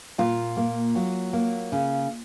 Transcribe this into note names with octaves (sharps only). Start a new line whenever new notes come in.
A#2 F4
A#3
F#3
A#3
C#3